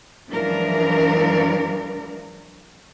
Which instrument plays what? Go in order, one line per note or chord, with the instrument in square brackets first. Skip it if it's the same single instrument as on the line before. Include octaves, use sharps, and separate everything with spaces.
[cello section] F#2 E3 F3 G#3 D4 A#4